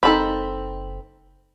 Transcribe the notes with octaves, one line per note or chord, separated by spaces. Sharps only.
F#1 C4 D#4 A4 B5